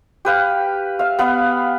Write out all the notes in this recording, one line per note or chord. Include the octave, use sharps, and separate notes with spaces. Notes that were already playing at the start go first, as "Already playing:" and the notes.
G4 B4 F5
E5 F5
B3 B4 F5